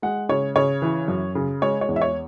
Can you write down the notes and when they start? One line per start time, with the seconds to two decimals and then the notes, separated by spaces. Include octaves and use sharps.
0.02 G#3 F#5
0.29 C#3 C#5
0.56 C#3 C#5
0.82 E3
1.08 F#2
1.35 C#3
1.62 G#3 C#5
1.81 C#5
1.89 E2
1.96 E5
2.01 C#5